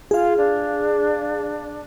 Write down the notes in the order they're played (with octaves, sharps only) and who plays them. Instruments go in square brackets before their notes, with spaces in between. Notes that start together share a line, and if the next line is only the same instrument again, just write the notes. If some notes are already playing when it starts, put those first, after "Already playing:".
[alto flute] F4 [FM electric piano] G#4 F5
[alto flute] D4